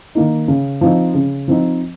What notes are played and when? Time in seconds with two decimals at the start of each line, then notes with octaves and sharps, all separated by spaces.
0.15 D#3 A#3 D#4
0.48 C#3
0.81 F3 C4 D#4
1.14 C#3
1.48 F3 C4 D#4